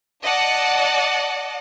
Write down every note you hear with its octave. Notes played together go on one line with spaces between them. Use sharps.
D5 D#5 F#5 A5